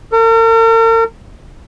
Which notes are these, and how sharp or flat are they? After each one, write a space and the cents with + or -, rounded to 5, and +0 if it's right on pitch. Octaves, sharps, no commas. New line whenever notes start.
A#4 -45